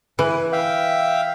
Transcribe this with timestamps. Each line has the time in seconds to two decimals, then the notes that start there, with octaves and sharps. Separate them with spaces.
0.19 E3 B4
0.52 E5 F5 G5